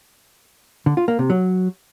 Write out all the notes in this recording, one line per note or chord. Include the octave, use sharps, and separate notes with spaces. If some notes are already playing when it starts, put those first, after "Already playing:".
D3
F4
A#3
C3
F#3